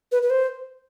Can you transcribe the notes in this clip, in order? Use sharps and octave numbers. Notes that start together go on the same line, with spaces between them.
B4
B4
C5